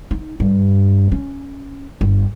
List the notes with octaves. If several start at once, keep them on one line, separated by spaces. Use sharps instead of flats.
D#4
G2
C#4
G1